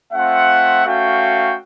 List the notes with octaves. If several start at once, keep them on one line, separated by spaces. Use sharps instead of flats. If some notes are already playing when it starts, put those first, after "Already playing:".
A3 C4 F4 E5 F#5
A3 C#4 F#4 F5 G5